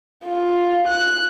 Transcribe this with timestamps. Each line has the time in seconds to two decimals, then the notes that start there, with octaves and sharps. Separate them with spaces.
0.24 F4
0.88 F#6